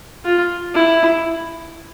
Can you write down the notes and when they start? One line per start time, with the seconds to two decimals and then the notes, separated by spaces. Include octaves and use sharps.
0.24 F4
0.74 E4